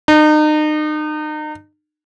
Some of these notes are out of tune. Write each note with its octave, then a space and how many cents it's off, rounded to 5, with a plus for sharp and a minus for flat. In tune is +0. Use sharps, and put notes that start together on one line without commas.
D#4 -35